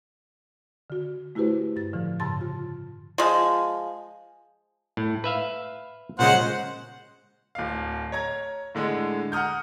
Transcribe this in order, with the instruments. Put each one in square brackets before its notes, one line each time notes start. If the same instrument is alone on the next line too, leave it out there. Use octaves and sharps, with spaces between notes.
[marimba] D3 F#4
A3 E4 F#4 G4 B4 C5
G2 A6
A2 D3 F3
G2 C#3 A5 C6 A6
F4
[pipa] F3 G#3
[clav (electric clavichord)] A2
B4 E5 F5
[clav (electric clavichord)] A#2 C#3 G#3 [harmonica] C5 F#5
[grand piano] D1 F5
C#5 A#5 G#6
A2 D3 G#3
F#5 A#5 D#6 F6 G6